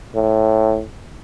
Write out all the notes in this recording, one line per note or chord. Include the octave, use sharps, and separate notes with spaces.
A2